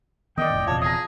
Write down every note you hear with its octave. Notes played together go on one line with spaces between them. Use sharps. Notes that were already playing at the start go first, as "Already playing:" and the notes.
D#3 B3 D5 D#5 G5
F1 A2
D#1 E2 C3 F3 C#5 A5
G#4 A#5 D#6